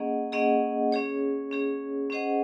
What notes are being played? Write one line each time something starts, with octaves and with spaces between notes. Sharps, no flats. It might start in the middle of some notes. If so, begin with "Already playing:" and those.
Already playing: A#3 C#4 G#4 D#5 F#5
A#3 C#4 G#4 D#5 F#5
C#4 G#4 C#5
C#4 G#4 C#5
C#4 G#4 C5 D#5 F#5